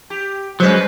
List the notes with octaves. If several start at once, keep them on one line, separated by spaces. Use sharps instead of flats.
G4
F#3 G#3 C#4 B4 C5